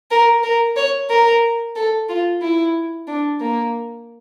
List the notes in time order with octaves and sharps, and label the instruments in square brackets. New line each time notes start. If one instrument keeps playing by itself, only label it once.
[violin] A#4
A#4
C#5
A#4
A4
F4
E4
D4
A#3